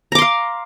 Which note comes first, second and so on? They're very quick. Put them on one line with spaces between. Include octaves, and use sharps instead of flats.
A#5 D6 C6 F5